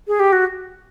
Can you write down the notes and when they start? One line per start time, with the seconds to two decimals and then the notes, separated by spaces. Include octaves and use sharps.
0.08 G#4
0.20 G4
0.32 F#4